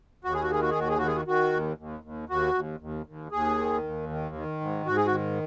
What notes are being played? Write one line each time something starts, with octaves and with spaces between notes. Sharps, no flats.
D#2 F#4
G#4
F#4
D#3 G#4
F#4
G#4
D#2 F#4
G#4
D#3 F#4
G#4
F#4
D#3 F#4
D#2
D#2
D#2
D#2 F#4
D#2
D#2
D#2
D#2 G#4
D#3
D#2
D#3
D#3
G#2
G#2 F#4
G#4
F#4
D#3